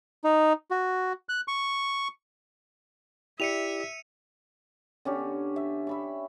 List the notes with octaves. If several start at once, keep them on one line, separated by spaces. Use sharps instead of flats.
D#4
F#4
F#6
C#6
E4 G4 D5 E5 C#7 D#7 F7
D3 C#4 G4
E5
E5 B5 C#6